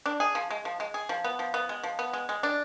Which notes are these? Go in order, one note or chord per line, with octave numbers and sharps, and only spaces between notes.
D4
G#4
F3
G#3
F3
G#3
G#4
F3
B3
F3
B3
G#3
F3
B3
G#3
G#3
D4